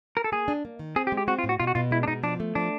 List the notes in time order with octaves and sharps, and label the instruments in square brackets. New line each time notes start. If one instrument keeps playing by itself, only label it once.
[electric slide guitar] A#4
A4
[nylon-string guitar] A#3 [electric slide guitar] G#4
[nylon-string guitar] D4
A#3
D#3
[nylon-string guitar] C4 [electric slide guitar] G#4
[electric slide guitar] G4
[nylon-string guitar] G#3
[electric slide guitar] G4
[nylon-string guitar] C4 [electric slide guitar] F#4
[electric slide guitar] F4
[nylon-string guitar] A2
[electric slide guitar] F#4
[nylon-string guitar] B2 [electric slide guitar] F4
[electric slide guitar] F#4
[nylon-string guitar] B2 [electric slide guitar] F4
[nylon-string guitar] G#3 [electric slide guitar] E4
[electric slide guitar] D4
[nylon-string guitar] B2 [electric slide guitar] D#4
[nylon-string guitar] F3 [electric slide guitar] D4
[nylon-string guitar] A3
[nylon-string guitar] F3 [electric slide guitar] D4